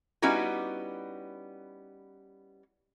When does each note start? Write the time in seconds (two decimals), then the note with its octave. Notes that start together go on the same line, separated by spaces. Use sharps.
0.22 G3 B3 C#4 D#4 E4 F#4